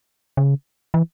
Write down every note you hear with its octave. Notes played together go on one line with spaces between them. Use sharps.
C#3
E3